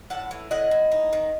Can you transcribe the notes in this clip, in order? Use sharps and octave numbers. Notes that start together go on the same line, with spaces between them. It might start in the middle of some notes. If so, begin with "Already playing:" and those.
A2 F#5 A5
E3
A2 D#5 F#5
A2
D#4
D#3